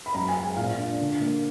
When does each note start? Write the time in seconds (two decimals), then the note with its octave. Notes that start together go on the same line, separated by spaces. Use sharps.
0.06 B5
0.14 F#2 A#5
0.29 G#5
0.35 G#3
0.43 G#5
0.56 A#2 F5
0.78 D4
1.00 D3
1.21 A#3